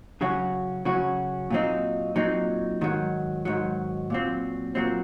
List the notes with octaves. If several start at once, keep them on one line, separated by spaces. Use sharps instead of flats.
C#3 F#3 C#4 F#4
C#3 F#3 C#4 F#4
A#2 F#3 C4 D#4
A#2 F#3 C4 D#4
G#2 D#3 F#3
G#2 D#3 F#3
A#2 F#3 C4
A#2 F#3 C4